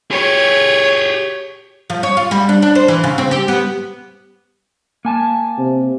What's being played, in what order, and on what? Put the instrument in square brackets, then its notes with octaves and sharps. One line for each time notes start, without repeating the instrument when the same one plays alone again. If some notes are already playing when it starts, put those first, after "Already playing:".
[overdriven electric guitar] G4 G#4 [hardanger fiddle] C#5
[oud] F3
C#5
F4
G3
D4
D4
C5
E3
C#3
C4
G4
B3
[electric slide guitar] A#3 G#5 A5
[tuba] C3